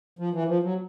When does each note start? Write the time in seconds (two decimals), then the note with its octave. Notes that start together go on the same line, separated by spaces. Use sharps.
0.19 F3
0.33 E3
0.48 F3
0.63 F#3